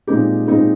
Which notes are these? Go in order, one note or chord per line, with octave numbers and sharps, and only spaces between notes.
A#2 G#3 C4 D#4 G4
A#2 G#3 C4 D#4 G4